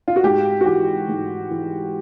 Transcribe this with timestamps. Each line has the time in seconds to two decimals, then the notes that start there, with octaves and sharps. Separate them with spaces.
0.08 F4
0.16 F#4
0.24 G#2 G4
0.61 F#4
0.66 E3 G4
1.09 G#2
1.50 E3